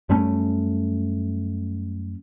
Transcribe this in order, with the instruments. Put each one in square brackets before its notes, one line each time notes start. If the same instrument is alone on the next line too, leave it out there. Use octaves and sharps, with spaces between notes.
[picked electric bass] F#2 G3 A3 C#4